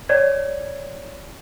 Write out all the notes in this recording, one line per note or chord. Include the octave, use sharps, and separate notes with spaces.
C#5 D5 G#6